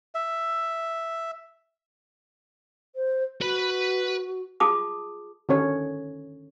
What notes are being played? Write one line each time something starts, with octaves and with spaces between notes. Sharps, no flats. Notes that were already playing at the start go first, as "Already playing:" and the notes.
E5
C5
F#4 B4 B5
F4 G#4 A5 D6 D#6
D3 D#3 C#4 C#5